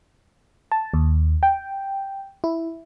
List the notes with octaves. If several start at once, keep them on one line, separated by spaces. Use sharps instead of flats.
A5
D#2
G5
E4